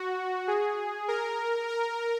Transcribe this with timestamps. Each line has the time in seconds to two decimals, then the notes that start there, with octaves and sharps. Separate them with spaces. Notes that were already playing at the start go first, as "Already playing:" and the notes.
Already playing: F#4
0.48 G#4
1.08 A#4
1.68 A#4